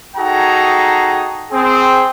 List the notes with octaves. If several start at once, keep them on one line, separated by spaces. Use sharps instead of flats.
D#4 F#4 G#4 A4 G5 A#5
C4 G#4